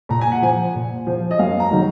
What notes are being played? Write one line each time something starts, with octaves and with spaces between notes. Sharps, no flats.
A#2 A#5
G#5
F#5
F3 G#5
A#2
F3
D#5
F#2 F5
A#5
D#3 F#3